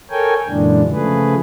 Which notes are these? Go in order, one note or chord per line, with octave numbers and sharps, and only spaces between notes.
A4 A#4 C#5 G5 G#5
F#2 A#2 D3 E3 G#3 D4
C#3 F3 A3 G#4 B4